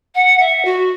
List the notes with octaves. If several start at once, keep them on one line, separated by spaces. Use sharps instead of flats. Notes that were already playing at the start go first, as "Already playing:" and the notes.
F#5
E5
F#4